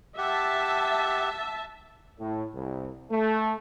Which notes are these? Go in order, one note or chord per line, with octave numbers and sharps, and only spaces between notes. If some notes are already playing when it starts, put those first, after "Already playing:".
G4 E5 F#5 A5
A2
C2
A3